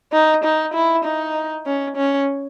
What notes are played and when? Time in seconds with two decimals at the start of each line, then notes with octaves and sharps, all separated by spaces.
0.12 D#4
0.44 D#4
0.74 E4
1.05 D#4
1.66 C#4
1.96 C#4